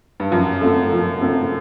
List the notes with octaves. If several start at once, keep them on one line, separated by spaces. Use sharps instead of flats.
G2
F#2 F3
A3 C4 F4 A4
F3
A3 C4 F4 A4